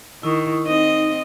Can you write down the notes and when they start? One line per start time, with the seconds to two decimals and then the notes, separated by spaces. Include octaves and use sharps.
0.23 D#3 E4 C#6 D#6
0.66 C4 D#4 D#5